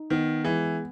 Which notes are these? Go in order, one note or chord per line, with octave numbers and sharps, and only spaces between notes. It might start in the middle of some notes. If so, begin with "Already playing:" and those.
Already playing: D#4
D#3 B3
E3 G#3